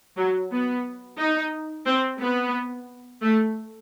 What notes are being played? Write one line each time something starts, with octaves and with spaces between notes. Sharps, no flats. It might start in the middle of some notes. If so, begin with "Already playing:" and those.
F#3
B3
D#4
C4
B3
A3